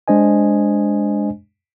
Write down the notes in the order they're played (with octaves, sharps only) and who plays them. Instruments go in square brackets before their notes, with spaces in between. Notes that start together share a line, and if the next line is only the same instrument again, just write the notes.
[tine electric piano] G#3 D4 C5 D#5 G#5